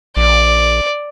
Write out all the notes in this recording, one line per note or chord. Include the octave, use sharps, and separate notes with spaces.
A#1 D5